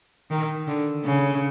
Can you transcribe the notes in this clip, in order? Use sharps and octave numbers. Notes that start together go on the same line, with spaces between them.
D#3
D3
C#3